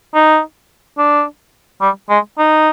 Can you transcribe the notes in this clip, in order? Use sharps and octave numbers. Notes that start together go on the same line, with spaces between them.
D#4
D4
G3
G#3
D#4